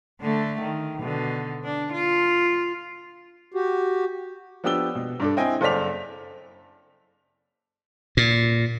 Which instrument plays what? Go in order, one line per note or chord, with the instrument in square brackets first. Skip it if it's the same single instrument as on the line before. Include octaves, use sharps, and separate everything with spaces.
[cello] D3 A3
D#3
B2 D3
D4
F4
[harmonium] F#4 G4
[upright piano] F3 B3 D4 G4 E6 G7
B2
G2 D4 A4
C4 E4 D#5 G5 G#5
F#1 A4 C5 D5 B6 F7
[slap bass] A#2